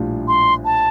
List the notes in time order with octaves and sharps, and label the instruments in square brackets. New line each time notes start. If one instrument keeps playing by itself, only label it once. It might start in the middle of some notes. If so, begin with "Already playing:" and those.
Already playing: [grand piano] A#1 A2 G3 D4 F4
[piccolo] C6
A5